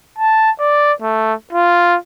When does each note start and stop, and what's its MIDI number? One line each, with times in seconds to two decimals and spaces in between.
0.18 0.51 81
0.60 0.93 74
1.02 1.34 57
1.53 1.97 65